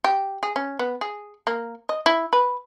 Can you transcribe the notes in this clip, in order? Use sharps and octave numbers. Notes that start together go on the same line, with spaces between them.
G4
G#4
C#4
B3
G#4
A#3
D#5
E4
B4